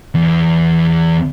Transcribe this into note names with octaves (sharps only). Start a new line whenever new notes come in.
E2